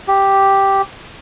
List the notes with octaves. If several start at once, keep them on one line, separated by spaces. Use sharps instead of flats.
G4